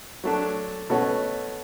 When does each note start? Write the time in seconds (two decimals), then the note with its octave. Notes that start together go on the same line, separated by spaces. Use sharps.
0.24 F#3 A3 D4
0.90 B2 A3 C#4 F#4